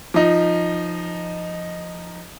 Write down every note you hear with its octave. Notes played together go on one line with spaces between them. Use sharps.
F3 D#4